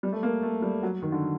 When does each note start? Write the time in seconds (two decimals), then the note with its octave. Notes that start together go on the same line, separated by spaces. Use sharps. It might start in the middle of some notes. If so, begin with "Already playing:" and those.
0.03 G3
0.12 A3
0.23 A#3
0.43 A3
0.62 G3
0.83 F#3
1.02 D#3
1.12 D3